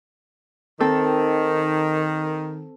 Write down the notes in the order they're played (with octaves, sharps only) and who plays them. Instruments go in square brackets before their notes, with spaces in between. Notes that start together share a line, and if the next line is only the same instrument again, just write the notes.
[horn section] D#3 [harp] C4 A4 E6